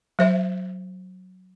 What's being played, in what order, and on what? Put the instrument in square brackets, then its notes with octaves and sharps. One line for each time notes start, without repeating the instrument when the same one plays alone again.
[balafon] F#3 C5 E5